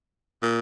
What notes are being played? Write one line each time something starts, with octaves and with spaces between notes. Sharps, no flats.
A#2